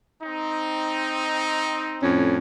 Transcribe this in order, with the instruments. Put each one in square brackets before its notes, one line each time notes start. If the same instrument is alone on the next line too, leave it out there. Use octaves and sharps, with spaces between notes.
[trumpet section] C4 D#4
[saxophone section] F2 A2 C#4